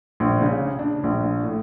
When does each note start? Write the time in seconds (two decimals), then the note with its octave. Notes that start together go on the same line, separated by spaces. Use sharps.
0.20 A#1
0.42 C#3
0.79 D4
1.04 A#1
1.43 A2